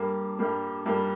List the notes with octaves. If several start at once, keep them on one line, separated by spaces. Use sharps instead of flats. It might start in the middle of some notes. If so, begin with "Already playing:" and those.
Already playing: G2 G3 A#3
G2 G3 A#3
G2 G3 A#3